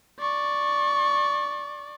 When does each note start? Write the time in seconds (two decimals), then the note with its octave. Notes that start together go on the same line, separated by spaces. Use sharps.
0.19 D5 C#6